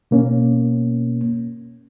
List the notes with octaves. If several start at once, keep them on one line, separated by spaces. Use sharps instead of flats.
B2 A#3 C#4